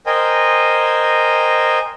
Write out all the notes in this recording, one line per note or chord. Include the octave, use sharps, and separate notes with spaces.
A#4 C5 D#5 G5 G#5